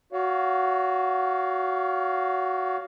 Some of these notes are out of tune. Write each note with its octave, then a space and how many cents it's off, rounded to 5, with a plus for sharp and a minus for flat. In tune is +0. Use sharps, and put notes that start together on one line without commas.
F#4 +0 C#5 +40 F5 +0